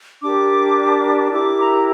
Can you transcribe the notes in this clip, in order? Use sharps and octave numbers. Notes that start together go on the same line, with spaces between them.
D4 G4 A#4 D6
E4 G4 A#4 D6
A#5